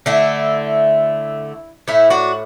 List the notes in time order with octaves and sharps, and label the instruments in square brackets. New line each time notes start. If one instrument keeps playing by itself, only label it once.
[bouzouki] D3 A3 E4
A2 A3 E4
D4 F#4